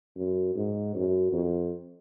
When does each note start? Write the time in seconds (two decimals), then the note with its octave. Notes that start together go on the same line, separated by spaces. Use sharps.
0.17 F#2
0.56 G#2
0.95 F#2
1.33 F2